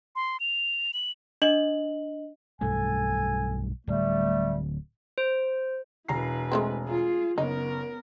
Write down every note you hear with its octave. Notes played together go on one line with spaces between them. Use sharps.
C6
F7
F#7
D4 D#5 F#7
B1 G2 A3 A4 G#5
D1 G3 A3
C5
E1 E4 B4 A#5 C7
G#3 A3 C4
F4 G#4
F#1 B3 D#4 A#4